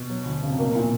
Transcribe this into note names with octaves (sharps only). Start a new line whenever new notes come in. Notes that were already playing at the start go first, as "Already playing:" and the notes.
Already playing: B2
F#3
D2
C#3
C3
B2 A#3
A#2